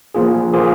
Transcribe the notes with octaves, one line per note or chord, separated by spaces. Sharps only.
F3 A#3 F4 G#4
F3 A#3 F4 G#4